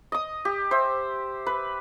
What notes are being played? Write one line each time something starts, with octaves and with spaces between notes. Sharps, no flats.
D#5 D#6
G4
C5 E5
B4